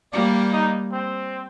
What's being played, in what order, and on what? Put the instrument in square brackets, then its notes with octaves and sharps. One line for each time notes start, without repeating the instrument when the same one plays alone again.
[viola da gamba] G3 A#3 [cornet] D5
[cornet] D#4
C4